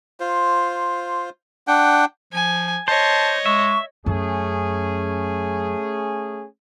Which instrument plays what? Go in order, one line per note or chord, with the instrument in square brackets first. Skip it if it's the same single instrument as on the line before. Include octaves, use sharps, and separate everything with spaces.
[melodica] F4 C5
D4 F#5 G5
[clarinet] F3 [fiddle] G#5
[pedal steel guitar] C5 [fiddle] C#5 D#5 [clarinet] A5
[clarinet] G#3 [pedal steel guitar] E5 [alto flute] C#6
[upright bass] F#2 [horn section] A3 C#4 G#4